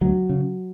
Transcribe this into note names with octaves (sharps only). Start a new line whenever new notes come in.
D2 F#3
C#3